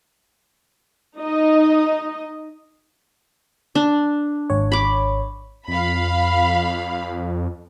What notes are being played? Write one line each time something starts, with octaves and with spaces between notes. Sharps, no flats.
D#4 D#5
D4
G#1 C#5
B5 D6
F2 F5 B5